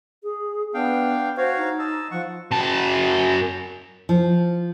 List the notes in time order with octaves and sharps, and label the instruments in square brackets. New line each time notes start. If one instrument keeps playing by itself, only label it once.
[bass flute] G#4
[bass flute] B3 [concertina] D4 F5 G5
[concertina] F#4 C#5 F5 [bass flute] C5
[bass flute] D#4
[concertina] D#5 A5 E6
[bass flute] F3 [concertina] F#5 C#6
[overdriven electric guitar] F#2 A5
[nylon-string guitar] F3